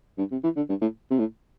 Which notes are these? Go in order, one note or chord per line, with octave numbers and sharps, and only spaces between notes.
G2
C3
E3
D3
G2
A2
C3
A2